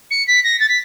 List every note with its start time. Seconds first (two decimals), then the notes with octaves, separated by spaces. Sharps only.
0.10 C#7
0.27 B6
0.43 A#6
0.60 A6
0.68 B6